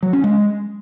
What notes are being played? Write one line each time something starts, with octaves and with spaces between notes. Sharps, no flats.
F#3
C#4
G#3